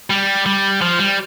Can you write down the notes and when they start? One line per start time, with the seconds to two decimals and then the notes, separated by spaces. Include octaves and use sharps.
0.10 G3
0.46 G3
0.81 F3
0.99 G3